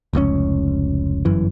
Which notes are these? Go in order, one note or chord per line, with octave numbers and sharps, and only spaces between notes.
F1 C#2 A2 C#4
G1 F#2 E3